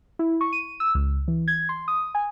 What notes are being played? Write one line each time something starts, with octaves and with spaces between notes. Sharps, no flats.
E4
C#6
D#7
E6
C#2
E3
G#6
C6
D#6
G#5